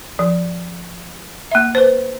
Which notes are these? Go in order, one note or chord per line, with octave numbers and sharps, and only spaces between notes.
F3
A#3 E5
B4 C5